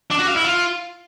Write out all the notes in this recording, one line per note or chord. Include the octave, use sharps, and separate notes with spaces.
D4
F#4
F5
E4
F4